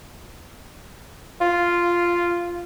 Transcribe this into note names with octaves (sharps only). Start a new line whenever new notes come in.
F4